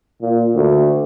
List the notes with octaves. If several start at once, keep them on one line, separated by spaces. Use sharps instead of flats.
A#2
D2